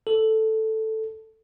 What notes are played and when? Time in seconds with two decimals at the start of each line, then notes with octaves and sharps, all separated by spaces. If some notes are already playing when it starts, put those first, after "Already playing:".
0.07 A4